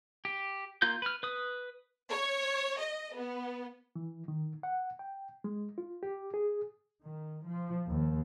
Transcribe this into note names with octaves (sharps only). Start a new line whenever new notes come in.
G4
A#3 F4 G6
B4 F6
B4 D#6
C#5
D#5
B3
E3
D#3
F#5
G5
G#3
F4
G4
G#4
D#3
F3
D#2